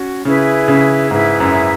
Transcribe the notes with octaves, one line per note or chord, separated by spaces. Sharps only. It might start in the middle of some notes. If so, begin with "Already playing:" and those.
Already playing: C#4 F#4
C#3 E4 G#4 B4 E5
C#3
G#2 E4 G#4 B4 E5
F#2